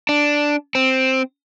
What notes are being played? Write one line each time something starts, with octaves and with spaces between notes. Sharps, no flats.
D4
C4